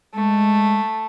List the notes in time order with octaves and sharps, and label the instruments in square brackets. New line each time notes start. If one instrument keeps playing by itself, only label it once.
[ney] G#3 [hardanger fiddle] A3